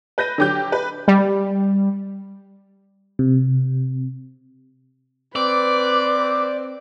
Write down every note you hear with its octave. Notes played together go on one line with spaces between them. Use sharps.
B4 G6 A#6 D#7
D3 F#3 G4 D6 G6
B4
G3
C3
C4 B4 D5 D6